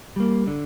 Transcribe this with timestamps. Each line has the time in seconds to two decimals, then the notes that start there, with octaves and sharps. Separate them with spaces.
0.16 G3 A#3
0.47 D3